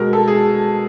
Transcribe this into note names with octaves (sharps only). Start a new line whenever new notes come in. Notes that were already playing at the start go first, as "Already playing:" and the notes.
Already playing: B2 G#3 A#4
A4
G#4